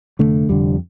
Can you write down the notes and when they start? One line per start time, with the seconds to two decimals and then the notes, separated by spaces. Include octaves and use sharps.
0.19 F1 F2 D3 A3
0.49 F1 F2 D3 G3